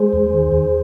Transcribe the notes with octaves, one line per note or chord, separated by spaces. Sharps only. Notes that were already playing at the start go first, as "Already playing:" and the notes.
Already playing: G#3 G#4 C5
E2
D#3
E2